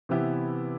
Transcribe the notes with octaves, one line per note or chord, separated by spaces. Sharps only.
C3 E3 B3 E4 G4